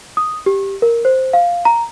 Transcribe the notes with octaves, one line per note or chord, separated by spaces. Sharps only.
D#6
G4
A#4
C5
F5
A#5